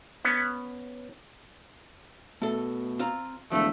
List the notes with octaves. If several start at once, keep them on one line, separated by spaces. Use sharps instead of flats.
B3 C#4
B2 A3 A4
C4 F4 A#5
E1 D2 G#2 F3 A3